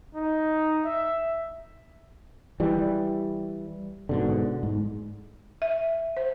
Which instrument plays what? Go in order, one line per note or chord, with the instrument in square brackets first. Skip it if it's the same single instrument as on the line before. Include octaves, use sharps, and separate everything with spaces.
[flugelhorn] D#4
E5
[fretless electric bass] E3 G3
G#2 B2 D3
G#2
[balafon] E5
C5